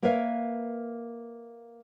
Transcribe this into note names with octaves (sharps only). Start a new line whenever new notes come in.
A#3 A#4 B4 C#5 E5 F5